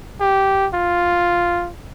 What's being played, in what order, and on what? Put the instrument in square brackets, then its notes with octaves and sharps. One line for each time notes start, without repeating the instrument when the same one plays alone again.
[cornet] G4
F4